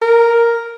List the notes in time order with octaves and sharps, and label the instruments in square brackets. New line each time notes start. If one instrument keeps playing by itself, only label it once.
[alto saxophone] A#4